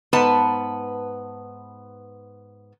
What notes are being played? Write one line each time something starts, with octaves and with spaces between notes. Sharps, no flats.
G#2 B3 B4 A5